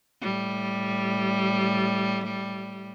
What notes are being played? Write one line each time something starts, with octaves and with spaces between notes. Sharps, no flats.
A2 G3